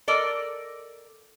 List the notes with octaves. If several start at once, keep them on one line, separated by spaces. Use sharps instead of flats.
A4 A#4 D5 D#5